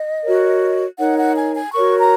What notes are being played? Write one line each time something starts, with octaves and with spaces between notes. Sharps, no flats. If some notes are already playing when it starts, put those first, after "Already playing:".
Already playing: D#5
F#4 A#4 C#5
D#4 A#4 C#5 F#5
F#5
G#5
G#5
F#4 A#4 C#5 C#6
A#5